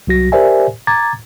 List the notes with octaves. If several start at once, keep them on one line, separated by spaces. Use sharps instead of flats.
C2 F#3 F#4 A#6
G4 A#4 C5 D5 E5 G#5
A#5 D6 G#6 A6